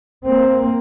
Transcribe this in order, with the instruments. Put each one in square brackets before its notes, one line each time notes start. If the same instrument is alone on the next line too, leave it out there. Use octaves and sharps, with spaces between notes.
[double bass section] A#3 C4